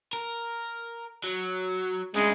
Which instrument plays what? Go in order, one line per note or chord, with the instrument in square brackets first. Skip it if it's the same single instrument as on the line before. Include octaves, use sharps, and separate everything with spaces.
[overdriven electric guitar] A#4
F#3
[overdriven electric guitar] D2 C#3 [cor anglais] G#3